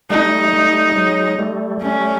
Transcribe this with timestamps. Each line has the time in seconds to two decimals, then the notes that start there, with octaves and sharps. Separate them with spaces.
0.10 G3 A3 D#4
0.53 G3 A3
0.96 F#3 G#3
1.39 G3 A3
1.82 G3 A3 C#4